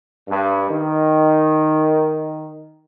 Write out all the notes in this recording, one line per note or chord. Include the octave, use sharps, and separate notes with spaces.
G2
D#3